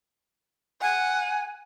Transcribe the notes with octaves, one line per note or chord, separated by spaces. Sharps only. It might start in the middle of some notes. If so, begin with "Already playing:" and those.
F#5 G#5